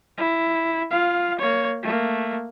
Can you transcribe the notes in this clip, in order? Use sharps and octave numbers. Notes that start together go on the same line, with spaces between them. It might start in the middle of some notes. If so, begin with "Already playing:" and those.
E4
F4 F5
A#3 C#5
A3 A#3